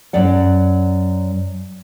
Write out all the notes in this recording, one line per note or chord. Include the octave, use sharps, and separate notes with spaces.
F#2 F#3 D5 F#5